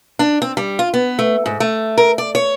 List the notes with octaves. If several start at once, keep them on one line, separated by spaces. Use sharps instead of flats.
D4
C4
G3
F4
B3
A3
G#2
A3
A#4
D5
C#5